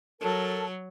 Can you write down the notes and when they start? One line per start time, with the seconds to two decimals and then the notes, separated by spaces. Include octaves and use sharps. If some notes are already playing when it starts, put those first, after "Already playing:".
0.21 F#3 A4 A#4 A5